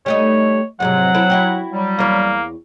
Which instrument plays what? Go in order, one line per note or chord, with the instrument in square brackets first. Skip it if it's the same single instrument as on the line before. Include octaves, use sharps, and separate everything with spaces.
[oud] G3 A3 D#4 [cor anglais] C#5
[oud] F2 G#2 C3 [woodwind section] F#3 [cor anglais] F#5
[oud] C4 E4 A4
E4 F#4 G4
[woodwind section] F#3 G3
[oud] E2 C#5 [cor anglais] A#3